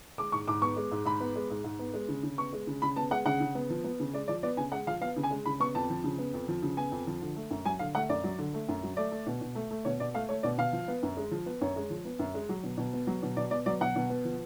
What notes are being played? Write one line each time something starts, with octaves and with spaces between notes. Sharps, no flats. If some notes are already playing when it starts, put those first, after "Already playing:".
G#3 D6
G#2 C#6
G#2 D6
B3 C#6
G#3
G#2
G#2 B5
B3
G#3
G#2
G#2
B3
G#3
C#3
C#3
B3 C#6
G#3
C#3
C#3 B5
B3 A5
G#3 F#5
C#3 F#5
C#3
B3
F3
B3
C#3
G#3 D5
F3 D5
B3 D5
C#3 G#5
G#3 F#5
F3 F5
B3 F5
C#3
G#5
G#3
C#3 B5
B3 C#6
F2 A5
F3
C#3
B3
F2
F3
C#3
B3 G#5
F2
F3
D3
A3
F#2
F#3 G#5
D3 F5
A3 F#5
F#2 D5
F#3
D3
A3
F#2
F#3
A3 D5
A3
B2
B2
A3
A3
B2 C#5
B2 D5
A3 F5
A3 C#5
B2 D5
B2 F5
F3
B3
F#2
G#3
F3
B3
F#2 C#5
G#3
F3
B3
F#2
G#3
F#3
B2
B2
B3
F#3
B2
B2 D5
B3 D5
F#3 D5
B2 F#5
B2
B3
F3